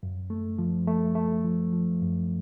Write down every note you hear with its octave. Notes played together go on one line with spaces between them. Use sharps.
F#2
A3
F3
A3
A3
F3
F3
F#2